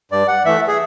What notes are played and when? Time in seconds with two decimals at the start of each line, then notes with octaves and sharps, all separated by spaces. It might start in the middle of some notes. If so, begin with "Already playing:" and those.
0.12 G2 D5
0.28 F#5
0.45 E3 A3 E5
0.68 G#4